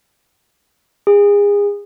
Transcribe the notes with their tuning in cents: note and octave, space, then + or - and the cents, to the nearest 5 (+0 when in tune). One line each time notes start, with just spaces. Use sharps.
G#4 -30